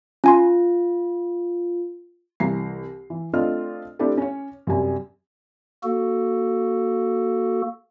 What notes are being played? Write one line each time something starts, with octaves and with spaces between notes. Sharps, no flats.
C#4 F4 G#5 C6
C2 E3 A#5 C7
E3
A3 C4 D4 F4 D#5 F6
A3 C4 D4 E4 G4 A4
C#4 C#5
F#2 C3 G3 G#5
A#3 F#4 A4